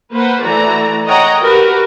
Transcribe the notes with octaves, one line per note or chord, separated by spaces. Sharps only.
A#3 B4 C5 F#5
E3 A3 F#4 D5 A#5
C#5 D#5 F#5 G5 A#5
F#4 G4 A#4 B4